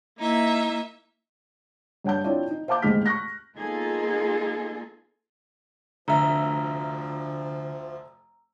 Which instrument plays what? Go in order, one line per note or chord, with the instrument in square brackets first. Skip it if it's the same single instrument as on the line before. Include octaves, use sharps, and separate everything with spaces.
[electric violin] A#3 E4 [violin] D#4 E5
[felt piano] G2 C#5 F#5 A5 G6
C4 D4 E4 F4 C#5
D#4
C5 F5 A5 D6 G6
A1 D#2 G#2 G#4 F6 B6
C#6 F#6 A#6
[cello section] A#3 B3 D#4 F4 G#4 A4
[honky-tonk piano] F1 E5 [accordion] D2 F3 [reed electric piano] D3 [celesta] A#5